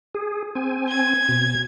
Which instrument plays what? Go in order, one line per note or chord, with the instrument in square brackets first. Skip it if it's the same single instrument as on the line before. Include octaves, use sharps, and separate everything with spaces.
[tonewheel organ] G#4
C4 G#5
[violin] G#6
[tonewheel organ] B2